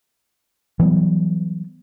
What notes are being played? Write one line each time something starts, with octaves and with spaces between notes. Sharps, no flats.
E3 F#3 G3 B3